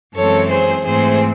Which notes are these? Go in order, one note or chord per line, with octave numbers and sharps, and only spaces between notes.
F#2 E3 G#3 C4 A4 C#5
G#4 C5
G#2 E3 A3 C4 G#4 C5